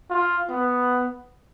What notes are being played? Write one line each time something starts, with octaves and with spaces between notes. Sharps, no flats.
F4
B3